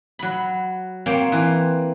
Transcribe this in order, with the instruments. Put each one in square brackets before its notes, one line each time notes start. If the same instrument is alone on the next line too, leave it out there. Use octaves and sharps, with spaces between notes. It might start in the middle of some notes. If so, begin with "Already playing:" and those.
[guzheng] F#3 B5
A#3 C4 C5 C#5 G5 C6
E3